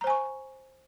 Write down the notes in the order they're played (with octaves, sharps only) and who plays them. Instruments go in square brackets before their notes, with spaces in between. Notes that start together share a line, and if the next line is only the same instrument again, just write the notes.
[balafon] A#5
C5
G#5
C#6